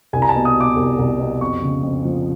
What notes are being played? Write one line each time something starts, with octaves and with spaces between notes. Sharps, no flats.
C2 G#5
A#5
A5
B2
D#6
B2
D6
C2
C2
B2
F2 C#6
C#3
F2
F3